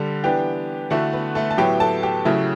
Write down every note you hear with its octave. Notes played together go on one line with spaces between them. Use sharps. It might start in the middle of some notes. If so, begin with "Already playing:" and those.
Already playing: D3 G3 A4
E3 B3 D4 G4 G5
D3 A3 E4 F#4 F#5
B3 B4
A3 A4
A5
A2 F#3 B3 E4 G4 G5
A4 A5
G4 G5
C#3 F#3 A3 E4